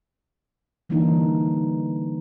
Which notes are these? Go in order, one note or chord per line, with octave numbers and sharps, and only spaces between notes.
D3 E3 G3 A#3 D4 D#4